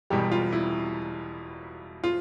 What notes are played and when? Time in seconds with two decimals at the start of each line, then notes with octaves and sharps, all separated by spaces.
0.10 E1 E2 B2 G3 G4
0.31 F4
0.52 E4
2.04 F4